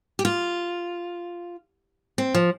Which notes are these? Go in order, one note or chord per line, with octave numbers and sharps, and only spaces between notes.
G4
F4
C4
F3